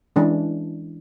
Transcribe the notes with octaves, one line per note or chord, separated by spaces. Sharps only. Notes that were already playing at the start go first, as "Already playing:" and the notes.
E3 G#3 C#4 D4